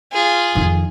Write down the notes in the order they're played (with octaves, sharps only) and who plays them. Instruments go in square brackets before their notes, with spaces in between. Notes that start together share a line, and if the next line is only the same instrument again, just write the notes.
[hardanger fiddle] F4 G#4
[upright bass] F2 D#3